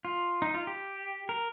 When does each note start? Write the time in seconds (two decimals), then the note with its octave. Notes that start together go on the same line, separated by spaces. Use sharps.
0.05 F4
0.42 D#4
0.54 F4
0.67 G4
1.29 A#4